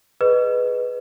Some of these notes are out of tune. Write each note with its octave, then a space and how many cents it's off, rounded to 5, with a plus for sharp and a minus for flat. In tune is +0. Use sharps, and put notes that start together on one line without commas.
G#4 +10 B4 +0 D#5 -20